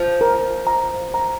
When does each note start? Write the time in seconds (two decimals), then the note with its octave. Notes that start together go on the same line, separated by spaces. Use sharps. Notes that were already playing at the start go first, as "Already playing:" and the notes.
Already playing: F3
0.21 A#4
0.67 A#5
1.14 A#5